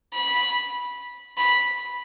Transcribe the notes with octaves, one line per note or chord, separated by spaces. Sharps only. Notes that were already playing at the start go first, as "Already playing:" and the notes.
B5
B5